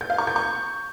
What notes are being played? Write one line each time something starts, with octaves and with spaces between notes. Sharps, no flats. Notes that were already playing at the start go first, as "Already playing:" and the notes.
G6
F5
C#6
G6
C#6